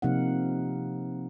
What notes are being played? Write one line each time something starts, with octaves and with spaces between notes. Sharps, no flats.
C3 F3 A#3 D#4 F5 F#5